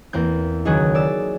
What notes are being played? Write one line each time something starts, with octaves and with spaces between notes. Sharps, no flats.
E2 A#3 C4 G6
C#2 D#3 F#3 G#4 F#6
D5 E6